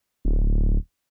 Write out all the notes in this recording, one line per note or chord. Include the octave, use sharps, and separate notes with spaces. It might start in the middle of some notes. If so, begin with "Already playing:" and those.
D1